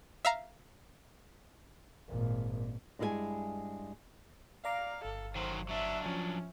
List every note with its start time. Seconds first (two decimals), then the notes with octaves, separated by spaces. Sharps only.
0.25 E5 F5 A#5
2.09 G#1 A#2
2.99 G2 G#3 E4 A4 G#5
4.65 D5 F5 A#5 D6
5.05 G1 A4
5.35 D#3 F#3 C5
5.69 F#3 D4 E5
6.06 F3 C#4